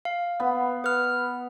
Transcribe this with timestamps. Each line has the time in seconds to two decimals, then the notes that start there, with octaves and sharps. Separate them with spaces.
0.05 F5
0.40 B3 B5
0.84 B4 F6